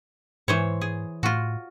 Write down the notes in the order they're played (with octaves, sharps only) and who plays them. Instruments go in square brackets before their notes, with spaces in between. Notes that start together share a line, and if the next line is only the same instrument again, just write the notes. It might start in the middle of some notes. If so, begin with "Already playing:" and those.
[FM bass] G#2 [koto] E3 C5 C#5
[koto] G#4
[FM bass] A2 [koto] F4 F#4